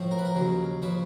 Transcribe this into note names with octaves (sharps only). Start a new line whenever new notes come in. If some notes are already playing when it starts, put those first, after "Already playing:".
Already playing: A2 F3 A3
A#4
B4
A#4
D#2 C#3 F#3
C#3 F3 B4